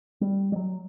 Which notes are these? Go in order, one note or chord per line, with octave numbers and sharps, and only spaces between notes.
G3
G3
F#3